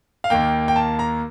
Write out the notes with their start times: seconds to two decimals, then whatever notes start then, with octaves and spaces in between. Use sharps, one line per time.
0.24 F5
0.30 D#2 D#3 A#3 G5
0.68 G5
0.76 A5
0.99 A#5